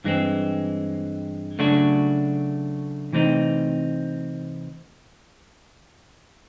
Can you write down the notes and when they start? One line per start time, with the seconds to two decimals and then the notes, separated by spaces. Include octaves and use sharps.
0.04 G2 E3 G#3 C4
1.59 C#3 F#3 A3 D4 F#4
3.13 C3 E3 A3 C4 D#4